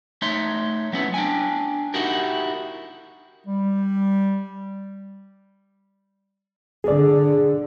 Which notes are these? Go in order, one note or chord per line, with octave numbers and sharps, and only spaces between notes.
A3 D#4 C#5 E5 C6
F#3 B3 C#4 E4
D4 G5 G#5
D#4 E4 F#4 G4 A#4
G3
D3 G#4 D5